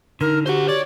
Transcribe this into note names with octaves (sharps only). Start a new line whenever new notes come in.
D3 D#4 A#4
F#4 G4 C5 F#5
C#5 D5